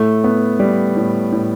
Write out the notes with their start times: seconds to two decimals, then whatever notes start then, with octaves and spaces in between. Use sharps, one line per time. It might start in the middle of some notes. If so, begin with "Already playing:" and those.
Already playing: A2 A3
0.24 B3
0.59 G3
0.96 A2
1.32 A2